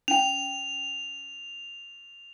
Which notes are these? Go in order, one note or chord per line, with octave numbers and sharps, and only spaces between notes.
C#4 G5 F7